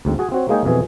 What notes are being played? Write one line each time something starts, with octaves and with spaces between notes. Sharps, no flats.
D2 G#2 C4
F#4 G#4 G#5
C4 F#4 C#5
G#3 A#3 D#4 G#4 C#5 G5
F2 B2 E3 G#4